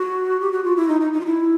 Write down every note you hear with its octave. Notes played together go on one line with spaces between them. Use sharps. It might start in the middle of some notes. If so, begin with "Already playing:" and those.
Already playing: F#4
G4
F#4
F4
E4
D#4
D#4
D#4
F4
E4